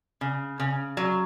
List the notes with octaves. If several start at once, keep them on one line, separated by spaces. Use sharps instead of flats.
C#3
C#3
F#3